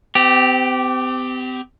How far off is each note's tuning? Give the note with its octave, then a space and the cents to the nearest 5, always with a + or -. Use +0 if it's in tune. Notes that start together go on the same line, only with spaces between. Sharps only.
C4 -40 G4 +0